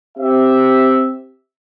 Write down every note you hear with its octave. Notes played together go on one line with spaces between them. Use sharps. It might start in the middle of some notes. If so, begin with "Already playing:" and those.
C4 G4 E5